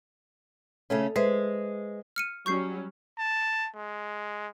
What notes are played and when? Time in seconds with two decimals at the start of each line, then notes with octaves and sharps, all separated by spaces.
0.90 C#3 A3 C#4
1.16 G#3 B4 C5 E5
2.16 F6 C#7 D#7
2.46 F#3 G3 C#4 C#6 G6 C7
3.18 A5
3.75 G#3